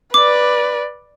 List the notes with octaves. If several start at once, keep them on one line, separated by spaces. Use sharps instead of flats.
B4 D5 D6